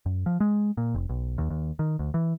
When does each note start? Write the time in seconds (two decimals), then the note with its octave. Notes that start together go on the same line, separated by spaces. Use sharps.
0.06 F#2
0.26 F3
0.40 G#3
0.77 A#2
0.95 F1
1.09 B1
1.38 D#2
1.50 D#2
1.79 D#3
1.99 D2
2.14 E3